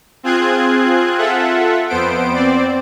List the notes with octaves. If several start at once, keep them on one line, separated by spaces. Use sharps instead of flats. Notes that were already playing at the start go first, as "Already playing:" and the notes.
C4 F4 G#4 F#6 G#6
F4 A4 E5 F#5
F2 B3 C5 D7
C4 C5 D5